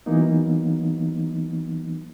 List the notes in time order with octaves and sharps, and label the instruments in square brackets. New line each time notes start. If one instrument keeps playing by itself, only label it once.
[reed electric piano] E3 F#3 A#3 B3 D#4